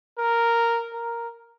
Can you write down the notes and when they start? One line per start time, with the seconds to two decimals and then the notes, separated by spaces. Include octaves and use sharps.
0.18 A#4
0.94 A#4